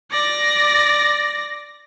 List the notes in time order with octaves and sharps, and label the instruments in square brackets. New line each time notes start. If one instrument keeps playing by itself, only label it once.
[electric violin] D5 A#6